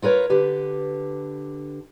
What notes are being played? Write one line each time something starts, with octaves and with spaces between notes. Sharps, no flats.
F4 A#4 B4 C#5
D3 G4 B4